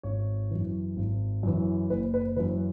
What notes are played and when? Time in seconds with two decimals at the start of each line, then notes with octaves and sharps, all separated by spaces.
0.03 G#1 C#5
0.51 F#2 E3
0.97 G#1
1.43 F#2 E3
1.90 F#1 B4
2.14 B4
2.36 E3 B4
2.39 F#2